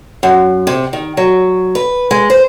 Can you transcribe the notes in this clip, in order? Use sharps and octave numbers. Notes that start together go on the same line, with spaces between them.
F#2
C3
D#3
F#3
B4
G#3
C5